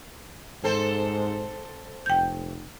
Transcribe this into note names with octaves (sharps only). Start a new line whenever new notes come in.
G#2 C4 A4 C5
F1 G5 G6